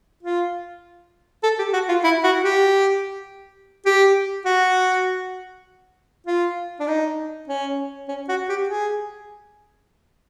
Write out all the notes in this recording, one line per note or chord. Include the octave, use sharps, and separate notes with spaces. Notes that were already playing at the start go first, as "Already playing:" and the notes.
F4
A4
G4
F#4
F4
E4
F#4
G4
G4
F#4
F4
D4
D#4
C#4
C#4
F#4
G4
G#4